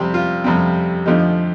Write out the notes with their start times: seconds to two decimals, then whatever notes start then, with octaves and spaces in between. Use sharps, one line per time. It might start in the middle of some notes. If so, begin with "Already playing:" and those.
Already playing: F2 C3 G3 C4 G4
0.14 F4
0.44 F2 C3 G3 C4
1.06 F2 D3 F3 A3 D#4 G4